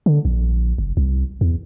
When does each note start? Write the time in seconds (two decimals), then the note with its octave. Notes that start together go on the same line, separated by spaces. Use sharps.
0.06 D3
0.25 A#1
0.78 F#1
0.97 C2
1.41 E2